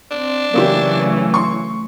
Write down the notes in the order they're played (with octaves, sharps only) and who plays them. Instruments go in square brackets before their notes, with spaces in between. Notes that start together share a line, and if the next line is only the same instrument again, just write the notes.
[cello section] C4 [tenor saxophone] D4
[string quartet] C#3 E3 [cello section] F#3 A3 [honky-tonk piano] A#3 E4 G4
[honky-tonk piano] C6 C#6